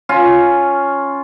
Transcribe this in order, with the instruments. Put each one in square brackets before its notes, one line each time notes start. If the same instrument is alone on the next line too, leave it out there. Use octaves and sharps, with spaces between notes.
[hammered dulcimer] C#4 F4